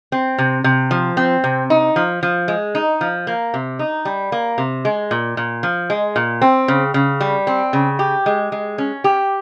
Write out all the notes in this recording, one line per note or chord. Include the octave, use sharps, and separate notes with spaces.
C4
C3
C3
F3
C4
C3
D#4
F3
F3
G#3
D#4
F3
A#3
C3
D#4
G3
A#3
C3
G#3
A#2
A#2
F3
G#3
A#2
C4
C#3
C#3
G3
C4
C#3
G4
G#3
G#3
C#4
G4